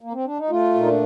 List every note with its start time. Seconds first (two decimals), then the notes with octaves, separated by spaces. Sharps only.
0.00 A#3
0.13 C4
0.26 D4
0.38 D#4
0.50 A3 F4
0.75 A#2
0.80 D#4
0.87 D4